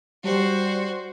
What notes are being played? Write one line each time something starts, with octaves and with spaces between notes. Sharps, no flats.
G3 F#4 C5